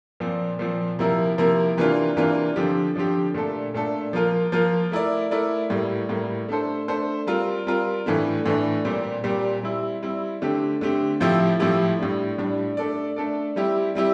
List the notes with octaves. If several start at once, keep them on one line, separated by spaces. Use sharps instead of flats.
A#2 F3 C4
A#2 F3 C4
C3 F3 A#3 E4 A#4
C3 F3 A#3 E4 A#4
C3 E3 A#3 D4 F4
C3 E3 A#3 D4 F4
D3 F3 C4 G4
D3 F3 C4 G4
A#2 A3 D4 A4
A#2 A3 D4 A4
F3 A#3 F4 A#4
F3 A#3 F4 A#4
A3 E4 A#4 D5
A3 E4 A#4 D5
A2 G3 A#3
A2 G3 A#3
A3 D4 A4 C5
A3 D4 A4 C5
G3 C4 F4 A#4
G3 C4 F4 A#4
A2 E3 A3 D4
A2 E3 A3 D4
A#2 G3 C4 G4
A#2 G3 C4 G4
G3 C4 E4
G3 C4 E4
D3 A3 C4 G4
D3 A3 C4 G4
A2 F3 C4 E4 G4
A2 F3 C4 E4 G4
A2 G3 D4
A2 G3 D4
A3 D4 A4 D5
A3 D4 A4 D5
G3 C4 E4 G4
G3 C4 E4 G4